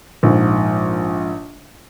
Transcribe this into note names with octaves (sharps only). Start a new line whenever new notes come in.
A#1 G#2